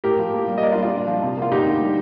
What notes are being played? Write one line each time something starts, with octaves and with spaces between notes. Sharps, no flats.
A2 G4 A#4
F3
A#3
G3
D#5
A#3 A#4 D5
D4 F4
G3
D4 F4
A#2
F3
C3
A#3 F4
D2 D#4 G4
D2
G3